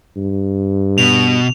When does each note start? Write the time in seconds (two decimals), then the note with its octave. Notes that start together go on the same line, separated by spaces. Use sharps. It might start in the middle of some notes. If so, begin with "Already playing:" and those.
0.17 G2
0.98 B2 F7